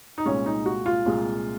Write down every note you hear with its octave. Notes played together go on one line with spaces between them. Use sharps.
D#4
C2 A#2 G#3 C#4
D#4
F#4
F4
C2 A#2 G#3